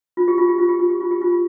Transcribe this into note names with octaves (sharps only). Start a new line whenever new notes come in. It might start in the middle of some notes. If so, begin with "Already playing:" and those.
F4
G4
F4
G4
F4
G4
F4
G4
F4
G4
F4